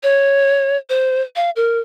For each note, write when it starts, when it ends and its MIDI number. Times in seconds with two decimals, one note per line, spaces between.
0.03 0.76 73
0.89 1.22 72
1.36 1.50 77
1.56 1.79 70